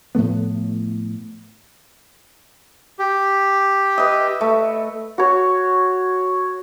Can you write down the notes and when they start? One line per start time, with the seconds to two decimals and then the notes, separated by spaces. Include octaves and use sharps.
0.15 A2 F3 A3 B3
2.99 G4
3.98 B4 D#5 E5
4.41 A3
5.18 F#4 C#5